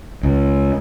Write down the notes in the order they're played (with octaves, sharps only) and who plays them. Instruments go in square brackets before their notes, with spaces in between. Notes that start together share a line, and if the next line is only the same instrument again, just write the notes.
[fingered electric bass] C#2